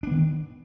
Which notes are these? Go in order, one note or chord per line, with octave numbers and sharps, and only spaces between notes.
D#3 B3 D4